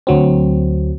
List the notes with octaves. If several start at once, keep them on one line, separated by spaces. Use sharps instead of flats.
D2 F#3 C4